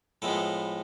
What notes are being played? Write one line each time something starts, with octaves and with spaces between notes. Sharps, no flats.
A2 F3 G#3 B3 A4